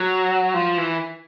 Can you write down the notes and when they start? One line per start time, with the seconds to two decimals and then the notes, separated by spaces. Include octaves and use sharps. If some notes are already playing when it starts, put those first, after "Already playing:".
Already playing: F#3
0.54 F3
0.78 E3